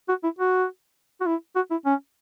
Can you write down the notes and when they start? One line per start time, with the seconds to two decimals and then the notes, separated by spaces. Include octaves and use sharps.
0.09 F#4
0.24 E4
0.39 F#4
1.21 F#4
1.26 E4
1.56 F#4
1.71 E4
1.85 C#4